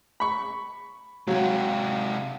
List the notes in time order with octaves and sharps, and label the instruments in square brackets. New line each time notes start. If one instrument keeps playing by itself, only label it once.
[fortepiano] B5 C#6
[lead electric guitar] C3 G#3 [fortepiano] F#3 [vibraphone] F5 F#5